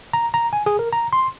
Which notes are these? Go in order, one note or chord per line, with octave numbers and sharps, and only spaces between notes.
A#5
A#5
G#5
G#4
A#4
A#5
C6